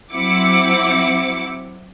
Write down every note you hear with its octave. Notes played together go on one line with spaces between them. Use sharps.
F#3 C4 E4 F#5 D6 C#7